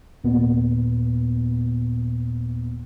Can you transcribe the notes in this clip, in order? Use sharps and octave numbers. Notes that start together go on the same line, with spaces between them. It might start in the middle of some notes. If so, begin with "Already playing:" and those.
D#2 A#2 B3